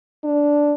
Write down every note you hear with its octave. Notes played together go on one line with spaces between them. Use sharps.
D4